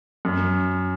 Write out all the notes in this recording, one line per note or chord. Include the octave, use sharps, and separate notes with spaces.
F#2